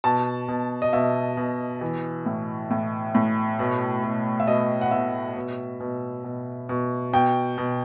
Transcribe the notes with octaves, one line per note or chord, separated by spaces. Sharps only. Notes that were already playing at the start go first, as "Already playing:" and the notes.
B2 A5
B2
D#5
B2 E5
B2
E3
A2
A2
A2
B2
B2
E5
B2 D#5
F#5
B2 E5
B2
B2
B2
B2
B2 G5
B2